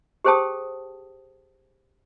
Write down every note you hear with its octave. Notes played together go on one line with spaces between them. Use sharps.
G4 G#4 C5 G5 A5 D#6